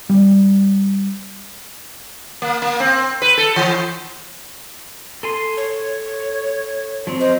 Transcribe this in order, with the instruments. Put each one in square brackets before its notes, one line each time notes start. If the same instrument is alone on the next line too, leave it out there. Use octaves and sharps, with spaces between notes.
[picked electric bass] G3
[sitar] A#3
A#3
C4
B4
A4
E3
[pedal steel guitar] A4 G#5 C6
[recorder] C#5
[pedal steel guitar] F3 F#3 C4
[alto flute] C5 [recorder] D#5